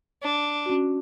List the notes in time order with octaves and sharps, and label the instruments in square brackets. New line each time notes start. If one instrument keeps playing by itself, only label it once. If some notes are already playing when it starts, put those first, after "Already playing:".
[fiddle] D4
[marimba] C#4 F#4